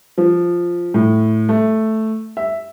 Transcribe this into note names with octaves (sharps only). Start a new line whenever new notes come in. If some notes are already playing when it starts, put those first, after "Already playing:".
F3
A2
A3
E5